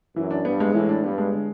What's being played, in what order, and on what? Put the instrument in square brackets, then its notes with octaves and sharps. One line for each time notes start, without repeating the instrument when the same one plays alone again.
[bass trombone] F#2 [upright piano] E3
[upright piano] D4
[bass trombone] G2 [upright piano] B3
[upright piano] G#3
[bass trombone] A2 [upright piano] E3
[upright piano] D4
[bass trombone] G2 [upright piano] B3
[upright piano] G#3
D3